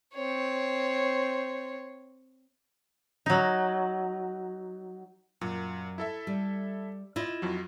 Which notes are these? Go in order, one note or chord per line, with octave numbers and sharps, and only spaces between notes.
C4 C#5
F#3 D#4
F#2 A#2
E4 A4 E5
G3
E4 F4 D#5
F2 F#3